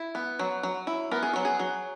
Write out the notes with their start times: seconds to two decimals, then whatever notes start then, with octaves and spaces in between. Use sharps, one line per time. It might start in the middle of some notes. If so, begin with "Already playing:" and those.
Already playing: E4
0.15 B3
0.39 F#3
0.63 F#3
0.87 E4
1.11 B3 A#4
1.23 G#4
1.33 F#3 F#4
1.45 G#4
1.59 F#3